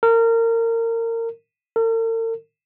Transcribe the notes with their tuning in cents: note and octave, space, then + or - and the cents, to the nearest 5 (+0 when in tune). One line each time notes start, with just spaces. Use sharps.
A#4 -25
A#4 -45